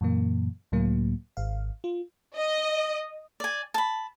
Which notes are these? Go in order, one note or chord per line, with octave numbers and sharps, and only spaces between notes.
F#2 A#2 E3 A#3
C#2 A2 F#3 A#3
G#1 F5
F4
D#5
D5 G#5
A5 B5